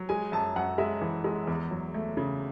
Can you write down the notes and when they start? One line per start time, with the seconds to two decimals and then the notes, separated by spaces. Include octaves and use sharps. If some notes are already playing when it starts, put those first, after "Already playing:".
Already playing: F#3
0.09 G#3 G#5
0.32 F#2 A5
0.56 F#2 F#5
0.78 G#3 E5
1.01 E3
1.24 G#3
1.47 E2
1.71 F#3
1.94 A3
2.17 C#3